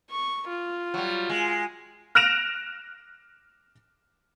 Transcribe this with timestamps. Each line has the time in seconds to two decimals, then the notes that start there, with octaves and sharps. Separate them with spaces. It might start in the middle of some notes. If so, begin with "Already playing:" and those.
0.10 C#6
0.47 F4
0.94 F#3 G3
1.30 G#3
2.15 F6 F#6 A#6 D7 E7 F7